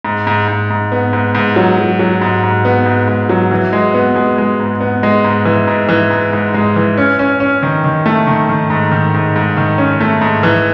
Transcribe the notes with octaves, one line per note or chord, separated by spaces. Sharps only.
G#2
G#2
G#2
G#2
B3
G#2
G#2
F#3
F#3
F#3
G#2
G#2
B3
G#2
G#2
F#3
E3
G#3
B3
G#3
G#3
G#2
B3
G#3
G#2
E3
G#2
E3
G#2
G#2
G#3
E3
C#4
C#4
C#4
D#3
D#3
A3
D#3
D#3
G#2
D#3
G#2
G#2
D#3
C#4
A3
G#2
E3